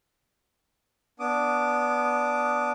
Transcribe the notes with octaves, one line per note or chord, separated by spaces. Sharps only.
B3 D4 D6 D#6